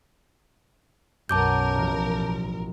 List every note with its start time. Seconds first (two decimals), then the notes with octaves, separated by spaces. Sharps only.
1.29 B1 F#2 A#4 A5 D6 G6
1.75 A1 F3